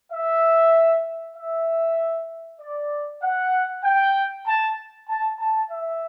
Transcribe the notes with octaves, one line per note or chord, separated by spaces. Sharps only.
E5
E5
D5
F#5
G5
A5
A5
A5
E5